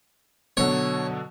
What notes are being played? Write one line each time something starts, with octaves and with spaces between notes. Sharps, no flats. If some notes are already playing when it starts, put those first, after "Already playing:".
B2 D3 F#3 C#5